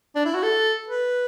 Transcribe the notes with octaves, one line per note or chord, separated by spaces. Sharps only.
D4
E4
F#4
A4
B4